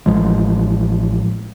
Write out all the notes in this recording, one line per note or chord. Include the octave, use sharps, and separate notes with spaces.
A1 F3 G#3